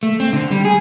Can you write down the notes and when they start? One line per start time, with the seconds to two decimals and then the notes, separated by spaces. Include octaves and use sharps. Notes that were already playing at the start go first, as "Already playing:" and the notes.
0.03 A3
0.20 C4
0.33 D3
0.52 G3
0.65 G#4